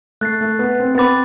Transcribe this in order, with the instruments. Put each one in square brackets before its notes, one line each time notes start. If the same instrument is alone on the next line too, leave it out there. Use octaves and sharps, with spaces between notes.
[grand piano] A3 [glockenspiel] F#6 A6 C7
[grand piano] A3
B3
C4
B3
[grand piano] C4 [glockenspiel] B5 D6 A6